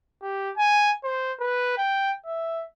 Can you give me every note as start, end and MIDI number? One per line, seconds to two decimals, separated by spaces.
0.23 0.51 67
0.57 0.91 80
1.04 1.33 72
1.40 1.76 71
1.78 2.13 79
2.26 2.64 76